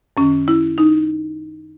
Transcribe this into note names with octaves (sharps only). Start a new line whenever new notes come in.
F#2 D#3 C#4
E4
D#4